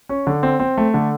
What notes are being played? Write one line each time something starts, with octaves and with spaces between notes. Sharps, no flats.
C#4
D3
C4
C4
A3
D3